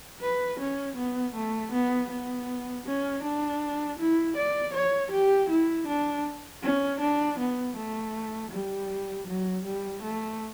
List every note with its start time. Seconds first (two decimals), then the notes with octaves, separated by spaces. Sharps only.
0.21 B4
0.59 C#4
0.96 B3
1.35 A3
1.71 B3
2.10 B3
2.86 C#4
3.23 D4
3.99 E4
4.36 D5
4.73 C#5
5.11 G4
5.49 E4
5.87 D4
6.63 C#4
7.00 D4
7.38 B3
7.76 A3
8.51 G3
9.27 F#3
9.64 G3
10.02 A3